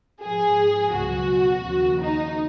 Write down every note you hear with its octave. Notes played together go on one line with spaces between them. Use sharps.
G#2 F3 G#4
C#2 B2 F#3 F#4
D#2 C#3 F3
D#4